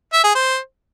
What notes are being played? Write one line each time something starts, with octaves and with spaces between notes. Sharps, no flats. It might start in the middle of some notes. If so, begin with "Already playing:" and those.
E5
G#4
C5